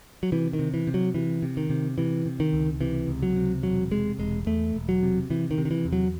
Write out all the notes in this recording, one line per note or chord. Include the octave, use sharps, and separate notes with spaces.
F#3
C3 E3
D#3
C3
E3
C3
F#3
C3 E3
C3
D#3
C3
C3 E3
C3
D#3
C#2
C3 E3
C#2
F#3
C3
E1 F#3
C3 G#3
E1 G#3
E2 A3
E1
F#3
C3
C3 E3
D#3
C3
D#3
E3
E2
F#3